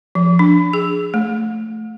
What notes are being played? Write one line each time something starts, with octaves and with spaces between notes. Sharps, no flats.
F3
D4
G#4
A3